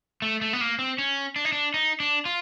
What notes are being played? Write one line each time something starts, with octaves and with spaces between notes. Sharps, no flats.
A3
A3
B3
A#3
C4
C#4
D4
D#4
D4
D#4
D4
F4